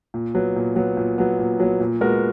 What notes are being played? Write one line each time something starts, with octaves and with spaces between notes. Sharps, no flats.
A#2
F#3 B3
A#2
F#3 B3
A#2
F#3 B3
A#2
F#3 B3
A#2
G#3 B3 F#4 A#4